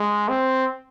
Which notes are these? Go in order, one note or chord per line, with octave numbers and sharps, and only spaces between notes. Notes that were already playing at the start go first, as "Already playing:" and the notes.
Already playing: G#3
C4